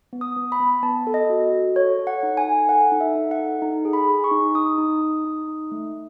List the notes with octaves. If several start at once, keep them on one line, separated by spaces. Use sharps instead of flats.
B3
D#6
B3
B5
B3
B3 A5
A4
D#5
F#4
F#4
A4 C#5
A4
F#5
D#4
G#5
A4
A4 F#5
D#4
E5
D#4
F#5
A4
D#4
G#4
B5
G#4
C#6
D#4
D#4 D#6
D#4
D#4
D#4
D#4
A3